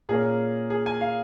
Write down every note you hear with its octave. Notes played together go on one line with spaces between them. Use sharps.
A#2 A#3 C#4 G#4
G#4
G#5
F5